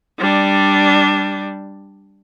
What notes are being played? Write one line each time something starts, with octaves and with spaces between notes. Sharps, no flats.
G3 D4